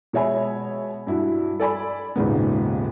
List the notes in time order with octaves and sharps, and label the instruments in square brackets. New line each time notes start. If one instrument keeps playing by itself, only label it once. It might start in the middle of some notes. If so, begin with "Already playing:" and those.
[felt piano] B2 G#3 C#5 E5 G#5 B5
G2 E4 F#4
A4 D5 G#5 B5
D#1 G#2 C#3 B3